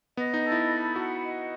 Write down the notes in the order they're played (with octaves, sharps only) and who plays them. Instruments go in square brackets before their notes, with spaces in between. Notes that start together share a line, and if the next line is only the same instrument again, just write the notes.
[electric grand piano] B3 [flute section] D#5
[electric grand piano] D#4
[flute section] A4
[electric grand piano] E4
[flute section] B5
[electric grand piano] F#4 [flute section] F#5
[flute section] D#5